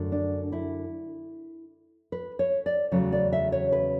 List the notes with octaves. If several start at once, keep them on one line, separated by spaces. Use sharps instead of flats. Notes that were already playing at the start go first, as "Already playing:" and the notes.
Already playing: F#2 D3 A3
D4
E4
B4
C#5
D5
E2 C#3 F#3 A3 C#4
D5
E5
C#5
B4